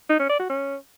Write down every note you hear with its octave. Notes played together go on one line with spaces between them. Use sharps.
D#4
C#4
D5
F#4
C#4